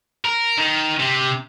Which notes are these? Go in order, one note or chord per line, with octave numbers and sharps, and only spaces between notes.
A#4
D#3
C3